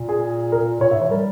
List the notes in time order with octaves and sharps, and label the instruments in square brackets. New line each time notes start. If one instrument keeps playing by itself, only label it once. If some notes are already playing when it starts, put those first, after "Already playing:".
Already playing: [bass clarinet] A#2
[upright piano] G#4
A#4
[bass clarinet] A#2 [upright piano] C#5
[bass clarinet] G#2 [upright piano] E5
[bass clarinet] E3 [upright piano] C#5
[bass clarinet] G3 [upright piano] A#4